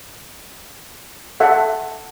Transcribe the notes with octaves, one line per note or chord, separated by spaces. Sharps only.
A4 E5 F#5